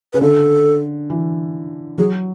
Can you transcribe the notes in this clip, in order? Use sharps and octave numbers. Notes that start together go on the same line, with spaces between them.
C#3 B4
D3 A4
E3
F#3 G#4